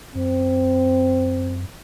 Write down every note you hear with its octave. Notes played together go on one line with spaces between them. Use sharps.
F#2 C4